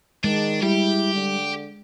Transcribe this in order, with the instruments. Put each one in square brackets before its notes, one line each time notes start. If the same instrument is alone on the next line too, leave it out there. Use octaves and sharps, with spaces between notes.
[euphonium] D#3 [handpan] G#3 [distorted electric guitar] D4
[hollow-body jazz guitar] G3 [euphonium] E4 [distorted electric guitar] G4
[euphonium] D3